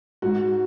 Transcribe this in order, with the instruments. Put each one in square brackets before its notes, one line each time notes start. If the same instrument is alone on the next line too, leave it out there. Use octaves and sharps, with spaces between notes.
[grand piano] G#2 F#4